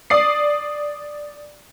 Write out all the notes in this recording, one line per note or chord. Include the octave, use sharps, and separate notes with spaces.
D5 D#6 C7